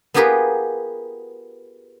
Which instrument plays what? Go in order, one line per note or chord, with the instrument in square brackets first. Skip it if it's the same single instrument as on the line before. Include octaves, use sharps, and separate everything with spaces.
[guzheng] B3 F4 G4 G#4 A#4 B4